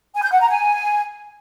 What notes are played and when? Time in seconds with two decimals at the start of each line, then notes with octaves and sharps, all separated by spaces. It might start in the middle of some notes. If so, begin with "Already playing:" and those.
0.14 G#5
0.23 G6
0.32 F#5
0.41 A#5
0.49 G#5